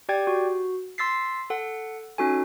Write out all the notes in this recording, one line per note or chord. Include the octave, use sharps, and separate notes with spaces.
G4 D5 G5 G#6
F#4
C6 E6 A6 B6 C7
A4 F#5
C#4 D#4 F#4 A4 G#5